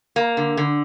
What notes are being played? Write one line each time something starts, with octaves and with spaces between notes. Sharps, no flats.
A#3
D3
D3